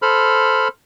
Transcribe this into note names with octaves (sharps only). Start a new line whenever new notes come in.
A4 C5 B5 F6